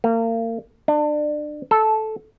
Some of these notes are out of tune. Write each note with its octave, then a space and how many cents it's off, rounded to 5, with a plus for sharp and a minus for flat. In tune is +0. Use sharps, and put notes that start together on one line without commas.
A#3 -35
D4 +30
A4 -10